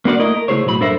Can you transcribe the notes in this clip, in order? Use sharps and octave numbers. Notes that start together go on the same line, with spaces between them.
A#3 D4 F#4 B4 D5
A3 A#3 E4 A#4 D#5
A#4
C#3 A3 E4 G#4 C5 C#5
B1 A2 F#3 B4 B5
F#2 D4 A4 A#4 C5 E5